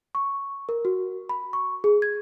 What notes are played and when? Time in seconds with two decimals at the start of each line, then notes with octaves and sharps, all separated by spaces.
0.15 C#6
0.69 A#4
0.85 F#4
1.29 B5
1.53 C#6
1.84 G#4
2.02 G#6